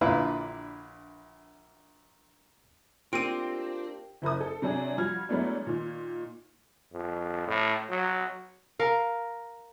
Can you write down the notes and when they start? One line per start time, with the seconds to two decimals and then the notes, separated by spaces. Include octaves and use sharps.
0.01 A#1 A#2 D3 E4 B4 F5
3.13 A#3 C4 D4 F4 G4 E6 D7 D#7
4.22 F#1 E4 A#4 D#6
4.41 A4
4.62 C3 F#3 D4 G#4
4.98 F3 G3 F#4 F6 G#6
5.29 E3 F#3 G#3 A3 B3 D4
5.66 A#2 D#3
6.92 F2
7.47 A2
7.89 F#3
8.79 A#4 F5